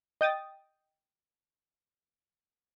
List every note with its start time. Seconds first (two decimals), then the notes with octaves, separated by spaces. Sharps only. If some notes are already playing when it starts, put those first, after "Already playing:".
0.21 D#5 G5 D#6 A6